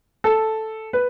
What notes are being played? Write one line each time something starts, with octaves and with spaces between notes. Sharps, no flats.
A4
B4